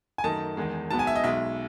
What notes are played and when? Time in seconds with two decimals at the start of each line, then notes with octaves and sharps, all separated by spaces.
0.18 G#5
0.24 F#2 D#3 A3 D#4 A5
0.57 E2 D#3 G#3
0.90 B1 B2 G#3 B3 A5
0.99 G#5
1.07 E5
1.15 D#5
1.24 B1 B2 G#3 E5